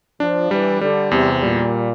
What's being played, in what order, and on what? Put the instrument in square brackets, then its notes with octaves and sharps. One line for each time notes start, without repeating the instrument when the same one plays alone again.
[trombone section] F3 [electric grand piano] D4
[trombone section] E3 [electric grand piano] G3
[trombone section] D3 [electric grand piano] G3
[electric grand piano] E2 [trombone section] C3
[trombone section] A#2 [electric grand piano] G3